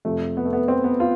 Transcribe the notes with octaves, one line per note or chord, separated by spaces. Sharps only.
F2 C3 F3 A3
B3
A3
B3
C4
B3
F4